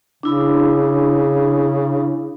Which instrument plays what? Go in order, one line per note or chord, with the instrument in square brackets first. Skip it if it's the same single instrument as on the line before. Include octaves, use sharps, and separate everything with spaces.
[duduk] C#3 [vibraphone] D4 E4 B5